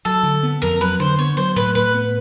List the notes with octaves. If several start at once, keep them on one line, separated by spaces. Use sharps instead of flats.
F#3 A4
D3
B3
F2 A#4
F#3 B4
D3 C5
B3 C#5
F#3 C5
A2 B4
A2 B4
B3